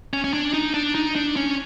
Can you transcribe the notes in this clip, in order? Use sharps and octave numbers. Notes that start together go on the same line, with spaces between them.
C#4
C#4
D4
D#4
D4
D#4
D4
C#4